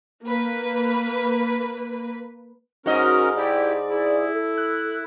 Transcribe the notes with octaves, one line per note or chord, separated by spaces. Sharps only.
A#3 B4
G#2 C#4 F#4 A#4 D#5
E4 G4 D5
E4 G#4
A4
F#6